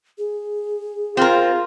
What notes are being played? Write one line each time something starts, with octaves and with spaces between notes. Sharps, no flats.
G#4
C4 F4 A#4